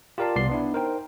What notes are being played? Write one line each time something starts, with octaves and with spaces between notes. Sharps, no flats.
F4 G4 A#4 D5 F5 A5
C2 B3 D5 C6 C7
B3 D4 E4
D#4 A#4 C5 G5